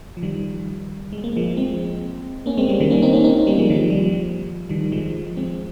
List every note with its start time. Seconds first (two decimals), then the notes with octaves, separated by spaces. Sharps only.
0.17 F3
0.23 D#3 G3
1.13 G#3
1.24 A#3
1.37 F3 G#3
1.57 G#3 C4
2.46 A#3 C#4
2.58 G#3 C4
2.69 G3 A#3
2.80 D#3 G3
2.91 A#3 C#4
3.02 C4 D#4
3.13 A#3 C#4
3.24 C4 D#4
3.47 G3 A#3
3.58 F3 G#3
3.70 D#3 G3
3.81 F3
3.90 G3
4.01 F3
4.69 D#3 G3
4.92 F3 G#3
5.37 G#3 C4